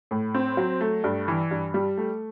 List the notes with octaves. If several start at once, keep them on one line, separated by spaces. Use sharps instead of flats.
A2
C4
F#3
A3
G2
E3
G2
G3
A3